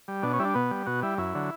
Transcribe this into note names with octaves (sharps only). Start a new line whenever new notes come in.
G3
B2 D4
C#4
G3 E4
D4
B2 B3
G3
B2 F#4
G3 E4
F#2 E4
D3 F#3